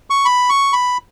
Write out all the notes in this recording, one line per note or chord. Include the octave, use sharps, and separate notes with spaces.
C#6
B5
C#6
B5